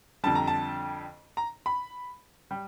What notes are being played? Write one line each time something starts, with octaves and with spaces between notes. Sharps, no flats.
F2 D3 G3 A5
A#5
A5
A#5
B5
G3